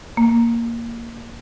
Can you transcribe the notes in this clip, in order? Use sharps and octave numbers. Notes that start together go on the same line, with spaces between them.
A#3